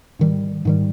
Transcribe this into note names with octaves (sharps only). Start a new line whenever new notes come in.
G#2 D#3 G3
G#2 D#3 G3